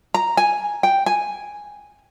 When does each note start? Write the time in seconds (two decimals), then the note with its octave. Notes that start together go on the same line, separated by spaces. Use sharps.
0.14 A#5
0.37 G#5
0.83 G5
1.06 G#5